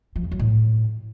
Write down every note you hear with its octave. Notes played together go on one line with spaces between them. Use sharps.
F3
E2
F#3
A2